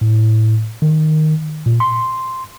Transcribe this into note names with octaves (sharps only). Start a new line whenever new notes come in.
A2
D#3
A#2
C6